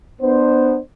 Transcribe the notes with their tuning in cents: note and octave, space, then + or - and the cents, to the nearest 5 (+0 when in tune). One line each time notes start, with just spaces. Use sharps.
B3 +0 D4 +30 C5 +0